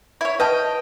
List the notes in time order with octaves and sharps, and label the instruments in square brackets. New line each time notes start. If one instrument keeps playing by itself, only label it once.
[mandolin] E4 C#5
[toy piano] B4 A5 [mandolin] D#5 G5